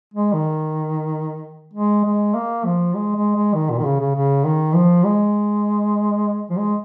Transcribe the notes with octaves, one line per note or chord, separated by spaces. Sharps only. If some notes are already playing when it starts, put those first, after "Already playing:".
G#3
D#3
G#3
G#3
A#3
F3
G#3
G#3
G#3
D#3
A#2
D#3
C#3
C#3
C#3
D#3
F3
G#3
F3
G#3